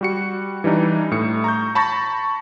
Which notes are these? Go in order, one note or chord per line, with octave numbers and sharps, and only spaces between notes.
G3 F#4 C#7
E3 G3 D4 D#4
A2 C#7
A#5 C#6 G6
A5 B5 C#6 G6 A6 A#6